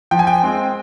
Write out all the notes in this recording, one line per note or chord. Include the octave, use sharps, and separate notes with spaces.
F3 G5
G#5
G5
G#3 C4